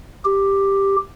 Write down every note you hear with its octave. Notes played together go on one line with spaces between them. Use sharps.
G4